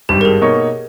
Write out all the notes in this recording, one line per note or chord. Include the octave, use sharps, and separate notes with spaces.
G#1 G2 G3 G4
A#4
G#4
B2 A#3 D#4 A#4 C#5